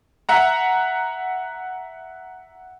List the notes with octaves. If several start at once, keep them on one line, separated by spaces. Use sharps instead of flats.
E5 F#5 A#5